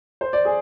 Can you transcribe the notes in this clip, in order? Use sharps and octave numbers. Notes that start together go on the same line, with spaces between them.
C5
D5
G#4